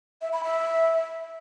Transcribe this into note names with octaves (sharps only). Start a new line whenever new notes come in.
E5
B5
E5